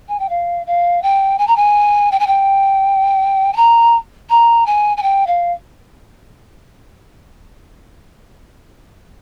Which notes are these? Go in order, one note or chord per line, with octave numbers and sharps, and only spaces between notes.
G#5
G5
F5
F5
G5
G#5
A#5
G#5
G5
G#5
G5
G#5
A#5
A#5
G#5
G#5
G5
F5